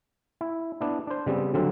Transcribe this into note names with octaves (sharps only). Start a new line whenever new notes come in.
E4
B3 D4 E4
D4 C5
C#3 G3 B3 C4
D3 F#3 G3 C4 F4